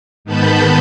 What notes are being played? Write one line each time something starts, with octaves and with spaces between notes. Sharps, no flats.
G#2 D#3 B3 A5 B5 G6